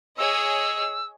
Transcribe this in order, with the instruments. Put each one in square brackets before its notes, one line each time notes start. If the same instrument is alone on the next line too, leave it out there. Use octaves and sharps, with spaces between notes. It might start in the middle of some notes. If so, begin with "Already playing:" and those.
[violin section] G#4 C#5 D#5 [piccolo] E6